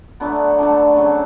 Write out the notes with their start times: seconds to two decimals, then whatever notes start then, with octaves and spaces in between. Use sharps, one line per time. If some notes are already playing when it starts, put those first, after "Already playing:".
0.20 D3 F#3 A3 B3
0.58 D3 F#3 A3
0.96 C#3 F#3 A3